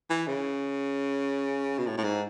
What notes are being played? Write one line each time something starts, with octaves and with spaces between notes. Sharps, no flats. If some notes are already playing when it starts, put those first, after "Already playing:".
E3
C#3
B2
A2
A2
G#2